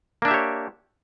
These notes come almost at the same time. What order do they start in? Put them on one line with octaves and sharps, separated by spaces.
A#3 D4 E5 G4 C#5